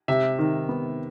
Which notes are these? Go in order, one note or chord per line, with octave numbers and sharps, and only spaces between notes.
C3 E5
D#3
B3